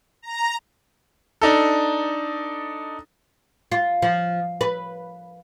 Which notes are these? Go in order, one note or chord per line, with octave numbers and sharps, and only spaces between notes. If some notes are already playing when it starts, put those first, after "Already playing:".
A#5
D4 D#4 A4
F4
F3
B4